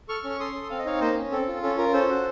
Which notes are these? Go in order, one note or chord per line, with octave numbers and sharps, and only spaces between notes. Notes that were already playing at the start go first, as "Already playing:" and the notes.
A4 C#6 F6
C#4
C#6
A4 C6 D#6
A4
C4 F5
D#5
D#4 C#5 F5
A#3 C5 D#5
C#4
C4 A4
F4
C#4 A4
F4 A#4
C#4 A4 C5
F#4